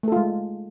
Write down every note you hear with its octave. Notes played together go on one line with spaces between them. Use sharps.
G#3 A3 F4 A4